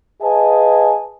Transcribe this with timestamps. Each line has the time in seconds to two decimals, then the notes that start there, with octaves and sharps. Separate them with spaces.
0.22 G#4 B4 D#5 F5 G#5 A5